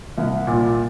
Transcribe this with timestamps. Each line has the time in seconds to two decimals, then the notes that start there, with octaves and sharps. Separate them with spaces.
0.18 C2
0.47 A#2